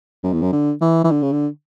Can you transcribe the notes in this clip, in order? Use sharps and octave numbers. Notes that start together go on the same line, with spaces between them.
F#2
E2
F#2
D3
E3
E3
D3
C#3
D3